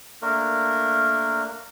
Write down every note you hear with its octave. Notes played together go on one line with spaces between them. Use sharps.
A3 A#3 D4 A#4